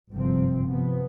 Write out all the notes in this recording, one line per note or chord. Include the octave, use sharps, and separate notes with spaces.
G1 F#2 C3 F3 C4
C3 F3 B3